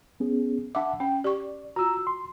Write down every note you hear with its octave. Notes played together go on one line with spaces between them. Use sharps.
B3 C#4 G#4
D4 E5 F#5 A5 D6
C#4 G5
G4 D5 C#6
F4 F#4 A#5 E6
C6